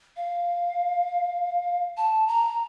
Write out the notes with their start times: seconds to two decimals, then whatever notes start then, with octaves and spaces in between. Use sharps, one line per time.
0.17 F5
1.97 A5
2.28 A#5